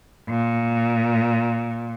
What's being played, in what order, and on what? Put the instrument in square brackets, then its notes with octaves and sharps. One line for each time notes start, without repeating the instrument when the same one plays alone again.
[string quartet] A#2